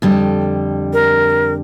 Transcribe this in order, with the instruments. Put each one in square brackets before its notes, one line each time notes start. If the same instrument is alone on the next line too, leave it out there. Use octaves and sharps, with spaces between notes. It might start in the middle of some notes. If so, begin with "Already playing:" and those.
[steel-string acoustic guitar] F2 D3 G3
[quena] A#4